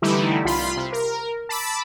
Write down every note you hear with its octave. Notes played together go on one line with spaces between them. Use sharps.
D3 E3 G3 A3 D#4 E4
C2 F4 B5 C6
C3
A#4
A5 B5 D6 E6